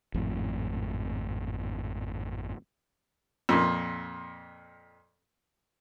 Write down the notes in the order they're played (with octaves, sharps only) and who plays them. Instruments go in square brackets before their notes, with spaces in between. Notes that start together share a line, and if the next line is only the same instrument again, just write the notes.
[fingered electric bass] G#1 F2 A2
[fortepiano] F2 A#2